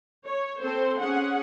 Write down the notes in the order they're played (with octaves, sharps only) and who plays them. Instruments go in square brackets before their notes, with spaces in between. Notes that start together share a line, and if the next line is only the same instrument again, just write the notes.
[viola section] C#5
C4 A4 C5
C#4 G#4 F#5